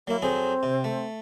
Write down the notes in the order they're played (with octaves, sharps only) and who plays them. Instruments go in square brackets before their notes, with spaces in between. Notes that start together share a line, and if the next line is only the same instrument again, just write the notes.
[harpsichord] F#3 E4 [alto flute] A#3
[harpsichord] F2 F#3 G#4 [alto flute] C4
[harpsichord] C3
A3